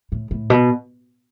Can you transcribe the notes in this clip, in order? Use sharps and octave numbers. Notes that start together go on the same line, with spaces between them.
A2
A2
B2